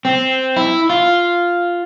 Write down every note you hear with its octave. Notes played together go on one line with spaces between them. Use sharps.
C4
E4
F4